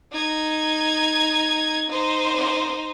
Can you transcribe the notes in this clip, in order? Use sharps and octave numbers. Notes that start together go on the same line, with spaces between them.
D#4 G#6
D#4 C5